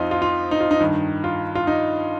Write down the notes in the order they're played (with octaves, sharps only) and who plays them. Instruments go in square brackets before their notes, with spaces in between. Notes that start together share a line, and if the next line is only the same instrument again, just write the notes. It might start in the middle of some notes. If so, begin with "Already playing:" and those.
Already playing: [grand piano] F2 C4 D#4 F4
F4
F4
D#4
F4
D#4
G2 D#3
F4
F4
D#4